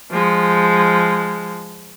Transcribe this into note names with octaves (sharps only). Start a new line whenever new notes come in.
F3 G#3